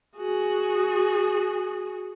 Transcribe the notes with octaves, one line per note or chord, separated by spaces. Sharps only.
F#4 G#4